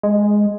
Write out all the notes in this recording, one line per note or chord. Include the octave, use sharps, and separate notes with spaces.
G#3